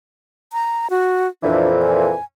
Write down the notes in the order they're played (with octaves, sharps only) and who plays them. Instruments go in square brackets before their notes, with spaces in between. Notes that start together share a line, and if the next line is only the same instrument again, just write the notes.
[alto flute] A#5
F#4
[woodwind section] F2 A#2 E3 [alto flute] D4
[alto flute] G#5